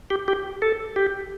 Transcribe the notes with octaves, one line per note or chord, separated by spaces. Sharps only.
G4
G4
A4
G4